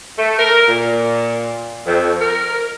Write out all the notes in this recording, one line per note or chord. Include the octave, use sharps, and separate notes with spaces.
A3
A#4
A#2
F2
A#4